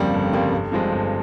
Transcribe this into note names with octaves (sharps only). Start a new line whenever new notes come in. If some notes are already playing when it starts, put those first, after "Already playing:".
Already playing: G1 F2 C#3 G3 A#3
G1
F2 C#3 G3 A#3
G1
G2 F3 G#3 C4
G1